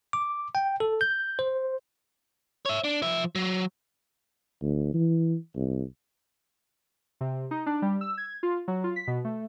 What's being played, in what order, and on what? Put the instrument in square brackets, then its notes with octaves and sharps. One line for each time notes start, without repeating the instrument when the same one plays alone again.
[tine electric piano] D6
G5
A4
G6
C5
[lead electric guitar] C#5 E5
D4
F3 E5
F#3
[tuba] D2
E3
C2
[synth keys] C3
D#4
D4
G3
E6
G#6
F4
F#3
F4
B6
B2
A3